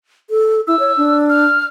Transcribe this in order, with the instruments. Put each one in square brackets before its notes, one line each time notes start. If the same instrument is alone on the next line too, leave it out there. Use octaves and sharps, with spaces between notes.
[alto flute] A4
[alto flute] E4 [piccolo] E6
[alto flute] C#5
D4
[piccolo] F6